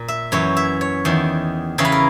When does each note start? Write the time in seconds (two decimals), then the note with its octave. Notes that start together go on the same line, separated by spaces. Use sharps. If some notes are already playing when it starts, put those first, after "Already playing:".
Already playing: A#2
0.08 E5
0.32 F#2 E3 C#5
0.57 E5
0.81 C#5
1.05 E2 D#3
1.78 E2 C#3 E3 C#5
1.85 B4
1.92 A#4